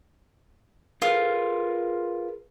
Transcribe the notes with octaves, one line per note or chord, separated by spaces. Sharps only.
F4 G#4 A#4 B4